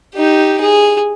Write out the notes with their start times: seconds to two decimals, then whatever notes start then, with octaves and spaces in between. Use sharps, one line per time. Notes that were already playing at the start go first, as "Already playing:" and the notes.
0.15 D#4 G4
0.61 G#4